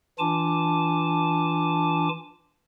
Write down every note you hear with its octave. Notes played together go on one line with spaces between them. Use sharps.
E3 D4 F4 G#5 A5 D6